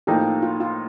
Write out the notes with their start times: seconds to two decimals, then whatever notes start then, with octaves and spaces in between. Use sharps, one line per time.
0.07 A2 F3 A#3 D#4 G4 A4
0.43 F4
0.60 F4